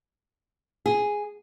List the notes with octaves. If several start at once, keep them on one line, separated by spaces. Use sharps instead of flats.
G#4